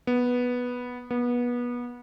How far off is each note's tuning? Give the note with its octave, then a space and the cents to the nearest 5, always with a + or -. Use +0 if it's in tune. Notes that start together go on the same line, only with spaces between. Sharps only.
B3 -5
B3 -25